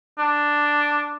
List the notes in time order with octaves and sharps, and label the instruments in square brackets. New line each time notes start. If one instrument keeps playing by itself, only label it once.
[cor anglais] D4